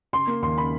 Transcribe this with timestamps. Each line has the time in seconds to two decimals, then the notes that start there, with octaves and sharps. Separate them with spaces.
0.13 C#3 C6
0.27 A#3
0.42 D#2 C6
0.57 C#3 B5